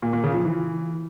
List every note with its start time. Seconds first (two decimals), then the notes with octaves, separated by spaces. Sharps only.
0.02 A#2
0.13 A#2
0.24 C#3
0.34 F3
0.45 E3